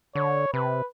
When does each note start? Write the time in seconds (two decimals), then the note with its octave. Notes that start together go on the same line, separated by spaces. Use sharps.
0.15 D3 C#5
0.54 C3 B4